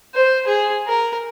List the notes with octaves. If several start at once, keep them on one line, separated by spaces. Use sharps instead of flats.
C5
G#4
A#4